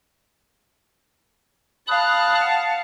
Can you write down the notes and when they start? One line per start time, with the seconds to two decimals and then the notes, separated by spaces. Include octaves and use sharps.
1.88 F5 A5 B5 D#6 F#6
2.42 F#5